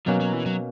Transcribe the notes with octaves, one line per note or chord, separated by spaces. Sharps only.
B2 F#3 A#3 C#4
F#3
E3
F#3